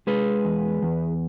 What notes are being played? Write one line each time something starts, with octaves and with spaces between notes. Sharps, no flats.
G#3 G#4 B4
E2
E2